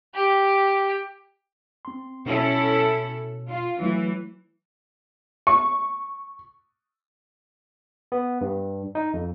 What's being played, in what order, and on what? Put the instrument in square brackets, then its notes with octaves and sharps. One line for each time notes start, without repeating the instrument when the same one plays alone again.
[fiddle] G4
[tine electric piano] C4 C6
[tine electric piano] B2 [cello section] C#4 E4 A4
[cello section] F4
[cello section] E3 [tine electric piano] F#3 A3 E4
[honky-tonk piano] C#6
[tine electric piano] B3
G2
D#4
F2